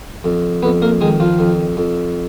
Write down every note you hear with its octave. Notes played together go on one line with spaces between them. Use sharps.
F2
F2 B3 B4
A#3 A#4
D#3 G#3 G#4
F3 F4
F2
F2